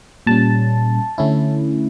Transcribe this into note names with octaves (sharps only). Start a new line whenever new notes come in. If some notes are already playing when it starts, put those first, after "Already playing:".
A#2 G3 C#4 A5
D3 A3 C#4 E4